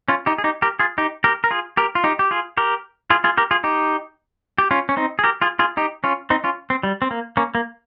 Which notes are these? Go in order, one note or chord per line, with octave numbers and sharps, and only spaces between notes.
C#4 F4
D#4 G4
G#4
D#4 G4
G4 A#4
F4 G#4
D#4 G4
G4 A#4
A#4
F4 G#4
G4 A#4
F4
D#4 G4
G4
F4 G#4
G4 A#4
F4 G#4
F4 G#4
G4 A#4
F4 G#4
D#4 G4
G4
C#4 F4
C#4
C4 D#4
G#4
G4 A#4
F4 G#4
F4 G#4
D#4 G4
C#4 F4
C4 D#4
C#4 F4
C4
G3
C4
A#3
A#3 C#4
A#3